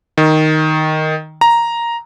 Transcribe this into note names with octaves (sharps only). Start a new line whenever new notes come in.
D#3
A#5